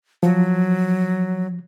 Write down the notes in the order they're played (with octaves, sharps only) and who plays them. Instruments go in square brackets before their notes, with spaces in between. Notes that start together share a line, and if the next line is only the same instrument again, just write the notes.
[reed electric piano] F3 [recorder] F#3